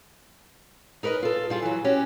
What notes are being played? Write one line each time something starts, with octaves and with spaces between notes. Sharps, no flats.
D#4 A#4 B4 D5 D#5
F4 A4
G3 F4 G#4
E3 F#3
C#4 F#4 G4